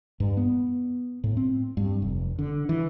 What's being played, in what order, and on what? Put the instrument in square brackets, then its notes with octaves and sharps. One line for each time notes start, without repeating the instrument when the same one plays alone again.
[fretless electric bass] G2
B3
A2
C4
G2
F1
D3
E3